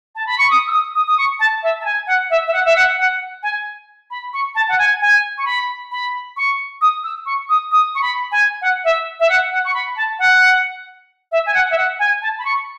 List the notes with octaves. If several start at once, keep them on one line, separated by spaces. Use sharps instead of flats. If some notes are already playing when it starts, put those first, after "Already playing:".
A5
B5
C#6
D#6
E6
D#6
D#6
D#6
C#6
A5
E5
A5
G#5
F#5
E5
E5
F#5
E5
F#5
F#5
G#5
B5
C#6
A5
F#5
G#5
G#5
C#6
B5
B5
C#6
D#6
E6
C#6
D#6
D#6
C#6
B5
G#5
F#5
E5
E5
F#5
F#5
C#6
B5
A5
F#5
E5
G#5
F#5
E5
F#5
G#5
A5
B5
C#6